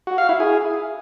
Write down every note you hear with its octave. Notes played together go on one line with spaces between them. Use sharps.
F#4
F5
E4
G#4